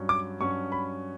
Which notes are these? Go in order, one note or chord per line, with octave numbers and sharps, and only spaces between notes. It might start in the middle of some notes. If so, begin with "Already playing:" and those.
Already playing: G2 F#3 C#4
D6
G2 F#3 C#4 C#6
B5